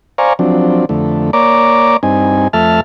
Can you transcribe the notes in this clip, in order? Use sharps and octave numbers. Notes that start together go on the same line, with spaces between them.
C5 D5 F5 G#5 A#5 C#6
F3 F#3 C4 D4
F2 D3 A3
A#3 C#5 D5 A#5 D6
G2 C4 D#4 G#5
F2 A3 E5 A5 F6